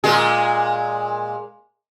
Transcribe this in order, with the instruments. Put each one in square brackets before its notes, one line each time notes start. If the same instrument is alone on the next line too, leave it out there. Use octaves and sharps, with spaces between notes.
[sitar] A#2 G#3 G#4